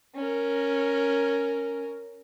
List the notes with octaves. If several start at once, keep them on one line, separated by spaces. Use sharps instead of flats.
C#4 A#4